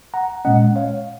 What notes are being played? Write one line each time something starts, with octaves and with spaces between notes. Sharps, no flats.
F#5 A#5
A#2 G#3 C#4 D#5 F#5
C#5 F5